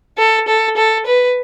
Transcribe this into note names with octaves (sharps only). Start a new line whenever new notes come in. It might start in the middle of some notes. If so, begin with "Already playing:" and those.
A4
A4
A4
B4